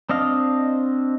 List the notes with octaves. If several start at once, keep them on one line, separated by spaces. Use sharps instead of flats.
C4 D4 D#5 F5